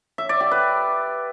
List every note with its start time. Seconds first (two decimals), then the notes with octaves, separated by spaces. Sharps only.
0.18 E5
0.29 D5
0.40 G4
0.51 B4